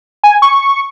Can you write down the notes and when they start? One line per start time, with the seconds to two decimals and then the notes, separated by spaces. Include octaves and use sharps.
0.24 G#5
0.42 C#6